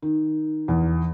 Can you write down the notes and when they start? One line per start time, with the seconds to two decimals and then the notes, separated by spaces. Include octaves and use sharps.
0.02 D#3
0.68 E2